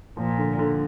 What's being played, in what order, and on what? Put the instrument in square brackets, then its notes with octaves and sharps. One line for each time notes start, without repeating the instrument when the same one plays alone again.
[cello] A#2 [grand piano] F3
[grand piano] D3
D3